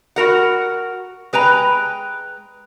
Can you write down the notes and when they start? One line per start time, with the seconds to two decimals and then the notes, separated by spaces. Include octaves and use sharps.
0.16 F#4 A#4 F#5
1.33 G#3 B4 G5 A#5